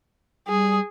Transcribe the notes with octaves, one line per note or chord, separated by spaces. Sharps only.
G3 G#4